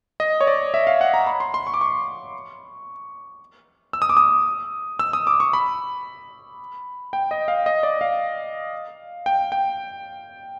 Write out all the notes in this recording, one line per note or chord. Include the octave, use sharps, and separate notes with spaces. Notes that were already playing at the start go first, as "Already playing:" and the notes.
D#5
C#5
D5
E5
F5
F#5
A#5
B5
C6
C6
C#6
D6
C#6
E6
D#6
D6
D#6
E6
D#6
D6
C#6
B5
G5
D#5
F5
D#5
D5
F5
G5
G5